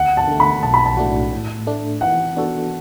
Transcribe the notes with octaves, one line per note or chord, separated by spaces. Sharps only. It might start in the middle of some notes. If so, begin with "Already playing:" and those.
Already playing: D2 F#5
A5
D3 A3
B5
B1 A5
B5
A5
A2 A3 D4 F#4
A2
A3 D4
E3 F#5
B3 D4 F#4 A4